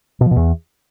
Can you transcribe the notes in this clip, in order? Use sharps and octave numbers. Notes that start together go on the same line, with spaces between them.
B2
F3
B2
E2